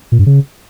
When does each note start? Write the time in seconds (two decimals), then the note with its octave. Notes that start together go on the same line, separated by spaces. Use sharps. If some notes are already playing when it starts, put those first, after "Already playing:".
0.12 A#2
0.19 G2
0.26 C#3